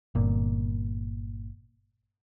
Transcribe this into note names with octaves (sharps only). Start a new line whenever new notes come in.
G1 A#2